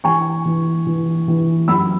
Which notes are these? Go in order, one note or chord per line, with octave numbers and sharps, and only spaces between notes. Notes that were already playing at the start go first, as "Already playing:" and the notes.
E3 G#5 C#6
E3
E3
E3
F#2 B5 E6